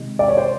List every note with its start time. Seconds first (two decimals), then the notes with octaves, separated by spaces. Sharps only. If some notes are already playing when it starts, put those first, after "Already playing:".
Already playing: C3 D#3 G#3
0.19 D5
0.28 C#5
0.37 C5